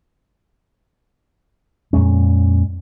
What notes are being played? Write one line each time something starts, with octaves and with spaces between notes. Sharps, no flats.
F2 A#2 G#3 C#4